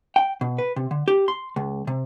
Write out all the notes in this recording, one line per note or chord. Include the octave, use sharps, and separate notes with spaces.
G5
B2
B4
C3
D3
G4
C6
C#2
C3